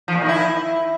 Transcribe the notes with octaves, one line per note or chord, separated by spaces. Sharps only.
F3
A#2
D#3
E4